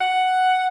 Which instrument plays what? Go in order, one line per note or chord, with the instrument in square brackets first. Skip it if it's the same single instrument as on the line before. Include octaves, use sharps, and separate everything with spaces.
[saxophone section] F#5